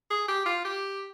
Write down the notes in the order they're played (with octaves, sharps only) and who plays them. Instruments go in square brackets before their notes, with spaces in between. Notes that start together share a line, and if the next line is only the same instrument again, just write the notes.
[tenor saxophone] G#4
G4
F4
G4